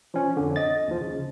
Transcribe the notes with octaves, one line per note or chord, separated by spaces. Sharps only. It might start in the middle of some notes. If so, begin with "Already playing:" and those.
F3 C#4
F2 D3
D#5 A6
D#2 F3
C#3